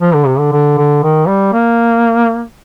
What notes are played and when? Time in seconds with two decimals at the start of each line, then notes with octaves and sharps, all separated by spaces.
0.01 F3
0.14 D3
0.26 C3
0.39 D3
0.53 D3
0.78 D3
1.03 D#3
1.28 G3
1.53 A#3